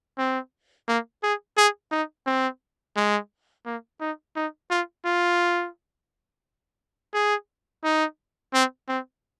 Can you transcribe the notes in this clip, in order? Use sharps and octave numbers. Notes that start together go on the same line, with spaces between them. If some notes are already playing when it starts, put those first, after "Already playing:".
C4
A#3
G#4
G#4
D#4
C4
G#3
A#3
D#4
D#4
F4
F4
G#4
D#4
C4
C4